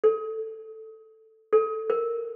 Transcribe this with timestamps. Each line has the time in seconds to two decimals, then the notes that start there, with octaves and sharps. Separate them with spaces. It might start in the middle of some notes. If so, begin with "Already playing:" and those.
0.04 A4
1.53 A4
1.90 A#4